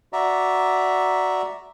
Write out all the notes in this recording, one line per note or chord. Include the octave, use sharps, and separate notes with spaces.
F#4 D5 E5 A#5